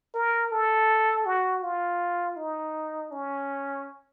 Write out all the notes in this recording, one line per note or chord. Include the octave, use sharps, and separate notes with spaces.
A#4
A4
F#4
F4
D#4
C#4